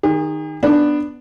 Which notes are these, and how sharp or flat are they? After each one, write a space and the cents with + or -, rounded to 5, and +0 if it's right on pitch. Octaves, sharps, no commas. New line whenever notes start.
D#3 -10 G#4 -45
B3 +0 D4 +5